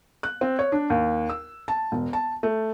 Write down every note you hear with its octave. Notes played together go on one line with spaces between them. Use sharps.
F#6
C4
C#5
D4
D#2
E6
A5
E1
A5
A3